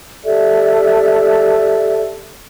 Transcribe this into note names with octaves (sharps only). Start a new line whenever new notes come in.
G4 A4 D5 E5